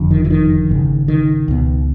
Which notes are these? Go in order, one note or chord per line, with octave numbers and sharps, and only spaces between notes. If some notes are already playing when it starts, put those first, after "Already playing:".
Already playing: F#1 F2 D3
D#3
E3
D#3
G#1 F#2 C#3
D#3
C#2 B2